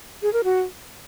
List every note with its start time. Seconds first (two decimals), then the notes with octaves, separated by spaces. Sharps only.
0.22 G#4
0.33 A#4
0.44 F#4